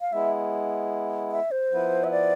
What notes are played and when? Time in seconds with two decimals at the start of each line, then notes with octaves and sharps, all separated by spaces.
0.01 F5
0.12 G#3 B3 E4 E5
1.32 E5
1.51 C5
1.71 F3 B3 E4 B4
2.04 E5
2.11 D5